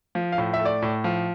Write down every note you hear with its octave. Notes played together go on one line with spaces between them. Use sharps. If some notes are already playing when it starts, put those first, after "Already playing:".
F3
F5
A2
E5
A3
D5
A2
F3